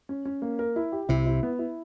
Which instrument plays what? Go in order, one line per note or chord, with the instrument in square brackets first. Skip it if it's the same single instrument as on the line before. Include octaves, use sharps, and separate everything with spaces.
[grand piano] C#4
C#4
A#3
A#4
E4
G4
[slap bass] C2 C3 [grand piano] E4
[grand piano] E4
B3
E4